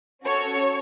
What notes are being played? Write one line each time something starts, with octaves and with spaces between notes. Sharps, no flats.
C#4 F#4 A4 C#5